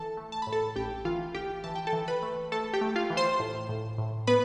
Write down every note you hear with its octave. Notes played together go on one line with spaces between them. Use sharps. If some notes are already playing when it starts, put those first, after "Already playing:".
Already playing: E3 A4 A5
A3
A5
A2 B5
A4 A5
A1 G4 G5
E3 F4 F5
A1 G4 G5
E3 A5
G5
A4 A5
E3
B4 B5
A3
A3 A4 A5
G4 G5
A3
F4 F5
E3
C5 C6
A2
A2
A2
B3 B4 B5